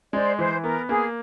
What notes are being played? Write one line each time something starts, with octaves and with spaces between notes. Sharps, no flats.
G#3 C5 D5
E3 C5
B3 A#4
A#3 G#4